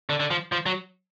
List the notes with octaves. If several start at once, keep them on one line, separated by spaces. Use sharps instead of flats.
D3
D3
F3
F3
F#3